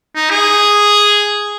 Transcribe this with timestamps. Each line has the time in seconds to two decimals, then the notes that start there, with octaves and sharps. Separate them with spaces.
0.16 D#4
0.30 G#4